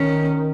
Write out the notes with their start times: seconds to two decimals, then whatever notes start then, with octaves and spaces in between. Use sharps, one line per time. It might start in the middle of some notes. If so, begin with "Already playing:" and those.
Already playing: D#3 C#4